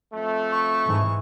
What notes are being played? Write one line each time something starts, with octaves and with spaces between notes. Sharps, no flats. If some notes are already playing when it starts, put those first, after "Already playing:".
F2 A3
C#6
G#2 E3